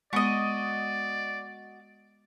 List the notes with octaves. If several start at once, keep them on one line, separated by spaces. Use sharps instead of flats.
G#3 B3 F#4 D5 D#5